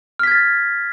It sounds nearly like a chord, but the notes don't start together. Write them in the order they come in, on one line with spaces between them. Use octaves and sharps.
F6 B6 G#6 A6